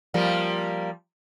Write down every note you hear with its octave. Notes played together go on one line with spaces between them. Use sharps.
F3 G3 A#3